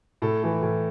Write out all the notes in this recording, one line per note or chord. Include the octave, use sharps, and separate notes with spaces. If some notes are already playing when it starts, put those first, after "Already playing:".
A2 A4
E3 A3
A2